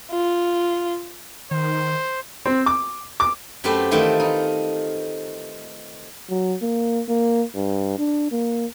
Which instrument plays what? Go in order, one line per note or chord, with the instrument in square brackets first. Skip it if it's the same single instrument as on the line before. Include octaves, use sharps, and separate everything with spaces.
[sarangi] F4
[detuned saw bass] D#3 [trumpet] C5
[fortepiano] C4
D6
D6
[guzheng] F#2 A3 C4 G4 B4 A5
D#3 E3 A3 E4 F4 A4
D#4
[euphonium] F#3
A#3
A#3
G2
D4
A#3